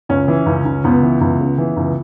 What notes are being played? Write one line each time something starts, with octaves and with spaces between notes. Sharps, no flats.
C#2 C#4
E3
C#2
C#2
C#2 B3
E3
C#2
C#3
E3
C#2